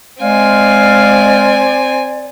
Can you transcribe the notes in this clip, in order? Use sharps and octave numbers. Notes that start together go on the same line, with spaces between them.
G#3 C4 D5 F5 G#5